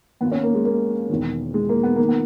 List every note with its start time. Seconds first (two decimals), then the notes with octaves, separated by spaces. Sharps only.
0.21 D#2 D#3 B3
0.32 C#4
0.43 A#3
0.54 G#3
0.65 A#3
1.10 E1 E2 D#3
1.54 G#3
1.69 A#3
1.83 B3
1.96 D#3 A#3
2.09 B3